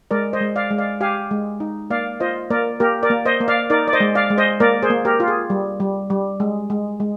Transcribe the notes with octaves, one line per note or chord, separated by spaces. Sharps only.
G#3 A#4 D5
C5 D#5
G#3
D5 F5
G#3
D5 F5
G4 F5 G#5
G#3
D#4
A#3 D5 F5
F4 C5 D#5
A#3 A#4 D5
A#3 G4 A#4
A#4 D5
A#3
C5 D#5
A#3
D5 F5
D#4 A#4 D5
D5
C5 D#5
G#3
D5 F5
G#3
C5 D#5
A#3 A#4 D5
G#4 C5
A#3
G4 A#4
F4
G#4
G3
G3
G3
G#3
G#3
G#3